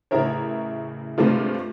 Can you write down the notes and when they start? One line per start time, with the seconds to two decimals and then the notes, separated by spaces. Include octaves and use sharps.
0.11 A1 C#3 E4 A#4 C#5
1.18 G2 C3 G#3 A3 F4